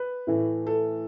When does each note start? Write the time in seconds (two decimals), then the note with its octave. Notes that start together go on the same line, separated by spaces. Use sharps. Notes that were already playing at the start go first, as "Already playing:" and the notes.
Already playing: B4
0.27 A2 E3 A3
0.67 A4